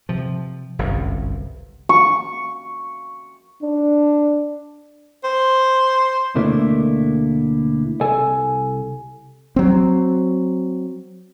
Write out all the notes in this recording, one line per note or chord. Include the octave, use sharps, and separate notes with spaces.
C3 F3
G1 C2 F#2
C#6
D4
C5
D2 B2 A3 A#3 D4 E4
C2 A4 G#5
F#3 C4